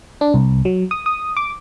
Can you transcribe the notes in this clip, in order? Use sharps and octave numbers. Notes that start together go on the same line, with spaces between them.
D4
C2
F#3
D#6
D#6
D6